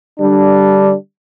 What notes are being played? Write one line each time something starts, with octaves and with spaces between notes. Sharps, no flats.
D3 G3 D4